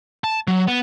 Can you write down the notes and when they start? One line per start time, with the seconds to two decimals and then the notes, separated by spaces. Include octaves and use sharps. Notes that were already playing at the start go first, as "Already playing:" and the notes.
0.24 A5
0.48 F#3
0.67 B3